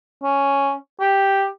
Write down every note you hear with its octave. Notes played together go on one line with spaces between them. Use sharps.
C#4
G4